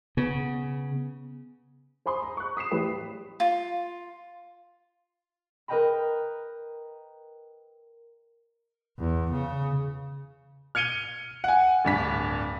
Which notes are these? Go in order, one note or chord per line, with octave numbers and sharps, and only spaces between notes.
C#3 B3
C5 G#5 B5 C6 D#6
A#5
C#6 F#6
D#6 B6 C7 E7
A1 G3 B4 G5
F4
A#4 B4 D#5 G5 A#5 B5
E2
C#3
F6 G#6 C#7 D#7 G7
F#5 G#5
D1 G2 B6